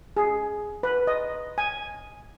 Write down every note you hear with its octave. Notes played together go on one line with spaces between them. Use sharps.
G#4
B4
D#5
G#5